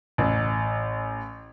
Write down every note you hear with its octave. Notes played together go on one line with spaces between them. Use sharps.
A1